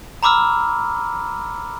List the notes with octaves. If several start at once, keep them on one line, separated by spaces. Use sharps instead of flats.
A#5 B5 D6 E6 F6